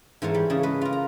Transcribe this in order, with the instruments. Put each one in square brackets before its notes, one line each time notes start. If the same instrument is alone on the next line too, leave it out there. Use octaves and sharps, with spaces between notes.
[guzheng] G#2 E3 A#4 C#5 A5
G3
C#3 G#4 C#5 A5
G#3 B4 D#5
F4 A#4
A#5